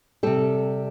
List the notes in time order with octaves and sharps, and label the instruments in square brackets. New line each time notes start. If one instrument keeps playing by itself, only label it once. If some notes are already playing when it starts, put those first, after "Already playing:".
[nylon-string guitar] C3 G3 A4